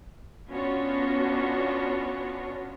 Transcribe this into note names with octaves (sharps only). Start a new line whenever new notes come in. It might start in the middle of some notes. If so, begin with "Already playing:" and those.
B3 C#4 D4 F4 F#4 C#5